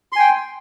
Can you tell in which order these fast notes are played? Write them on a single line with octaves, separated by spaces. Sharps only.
C6 G#5 G5